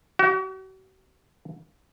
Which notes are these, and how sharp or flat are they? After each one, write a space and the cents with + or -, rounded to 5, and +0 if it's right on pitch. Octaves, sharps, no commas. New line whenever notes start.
F#4 +45